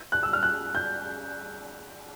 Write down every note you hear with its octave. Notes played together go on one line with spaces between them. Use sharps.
F#6
E6
F6
F#6
G6